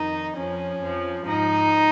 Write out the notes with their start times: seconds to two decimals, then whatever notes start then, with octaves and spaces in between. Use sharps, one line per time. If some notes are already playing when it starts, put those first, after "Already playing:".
Already playing: F2 D#3 D#4
0.36 F2 F3 C#4
0.80 F2
0.85 F3
1.24 G#2 F3 D#4